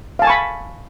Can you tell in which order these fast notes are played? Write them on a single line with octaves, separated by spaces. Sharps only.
F5 A5 G#5 C#6 B5